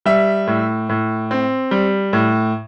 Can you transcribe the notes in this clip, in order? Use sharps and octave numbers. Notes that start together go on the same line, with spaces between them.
G3 E5
A2
A2
C4
G3
A2